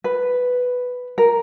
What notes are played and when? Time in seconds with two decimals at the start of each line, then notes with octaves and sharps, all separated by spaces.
0.04 B4
1.18 A#4